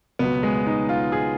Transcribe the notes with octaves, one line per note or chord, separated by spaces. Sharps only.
C#2 B2 F#3 B3
G#3
D#4
F4
G#4